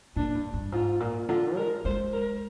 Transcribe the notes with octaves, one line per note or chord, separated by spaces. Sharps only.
A#2 D4
G2
G2
G#2 F4
A#2
D3 F4
G#3 A#4
G#3 C5
A#4